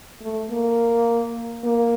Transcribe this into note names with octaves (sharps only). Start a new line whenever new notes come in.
A3
A#3
A#3